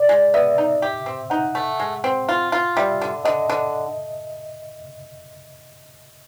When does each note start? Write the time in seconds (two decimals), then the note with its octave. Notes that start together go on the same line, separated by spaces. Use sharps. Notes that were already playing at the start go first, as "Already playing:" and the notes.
Already playing: D5
0.09 G#3
0.34 B3 E5
0.58 D#4
0.82 G4
1.06 C4
1.30 D#4 F#5
1.55 A3
1.80 G#3
2.04 C4
2.29 F4
2.52 F4
2.77 G3 E5
3.01 D3
3.25 D3 D#5
3.50 D3